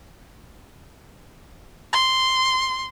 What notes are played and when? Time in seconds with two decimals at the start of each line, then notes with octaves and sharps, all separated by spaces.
1.93 C6